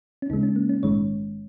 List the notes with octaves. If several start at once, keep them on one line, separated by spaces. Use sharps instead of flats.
C#4
D#2 C#3 G#3 D#4
C#4
A#3
C#4
A#1 G#2 D#3 G#3 C#5